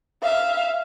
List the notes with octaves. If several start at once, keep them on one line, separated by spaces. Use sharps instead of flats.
E5 F5